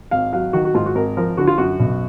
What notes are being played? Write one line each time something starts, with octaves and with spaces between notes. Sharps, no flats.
G#1 F5
F#3 F5
D#3 F#4
F#4
G#2 F4
F#4
G#1 A#4
F3 A#4
D3 F#4
F4
F#2 F#4
B1